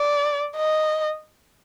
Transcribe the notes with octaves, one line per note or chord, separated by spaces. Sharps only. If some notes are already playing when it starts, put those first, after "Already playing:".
Already playing: D5
D#5